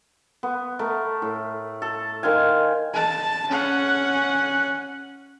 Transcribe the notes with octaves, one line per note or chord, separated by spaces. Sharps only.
B3
A3 A#4
A2
A4
D#3 C5 F5 G#5
A5
C#4 F#5